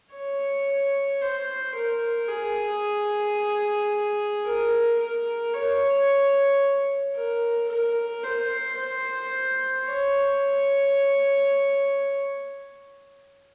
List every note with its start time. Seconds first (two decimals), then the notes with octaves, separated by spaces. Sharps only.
0.12 C#5
1.21 C5
1.74 A#4
2.28 G#4
4.45 A#4
4.99 A#4
5.53 C#5
7.14 A#4
7.68 A#4
8.23 C5
8.77 C5
9.85 C#5